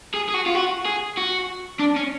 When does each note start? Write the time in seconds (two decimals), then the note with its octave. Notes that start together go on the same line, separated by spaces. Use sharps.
0.14 G#4
0.29 G#4
0.34 F#4
0.46 F4
0.55 F#4
0.86 G#4
1.18 F#4
1.79 D4
1.96 C#4